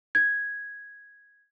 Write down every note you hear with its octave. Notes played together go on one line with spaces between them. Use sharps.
G#6